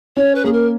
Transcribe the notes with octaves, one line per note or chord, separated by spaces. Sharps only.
C#4 C#5
B4
A#3 G#4
A#4